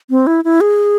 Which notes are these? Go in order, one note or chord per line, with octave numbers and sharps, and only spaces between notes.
C4
E4
E4
G#4